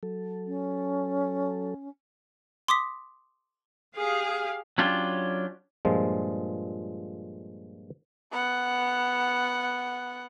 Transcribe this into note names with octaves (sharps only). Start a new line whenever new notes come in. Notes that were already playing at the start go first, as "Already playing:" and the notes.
F#3 A4
C#4
C6 D6 D#6 B6
G4 G#4 F5
F#3 C#4 D4 F4 G4
G2 A#2 F3 G#3
B3 F#5